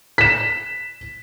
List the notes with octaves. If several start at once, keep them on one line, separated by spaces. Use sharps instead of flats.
B6 E7